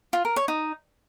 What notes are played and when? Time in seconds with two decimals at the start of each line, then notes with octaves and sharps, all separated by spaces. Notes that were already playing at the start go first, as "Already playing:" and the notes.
0.13 F4
0.25 A#4
0.36 C#5
0.48 D#4